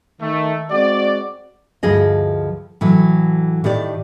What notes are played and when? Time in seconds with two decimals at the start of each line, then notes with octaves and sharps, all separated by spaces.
0.21 D#3 A3
0.71 G#3 C4 F#4 D5
1.83 D2 G2 F3 G#4 D#5
2.81 A2 E3 F#3
3.64 A2 D#3 G4 D5